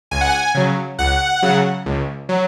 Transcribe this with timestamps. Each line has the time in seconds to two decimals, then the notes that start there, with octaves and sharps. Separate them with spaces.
0.11 C#2 G#5
0.21 F#5
0.29 G#5
0.55 C#3 F#3
0.99 C#2 F#5
1.42 C#3 F#3
1.86 C#2
2.29 F#3